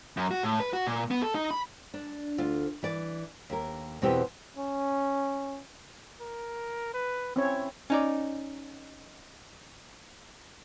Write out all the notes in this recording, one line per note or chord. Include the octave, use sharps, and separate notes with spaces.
F#2
F#4
A2
B4
F#4
A#2
B3
A4
D#4
B5
D4
D2 F4
E3 D5
D#2 A#4
E2 B2 C4 E4 G4 B4
C#4
A#4
B4
C4 C#4 E4 C#5
C#4 D#4 D5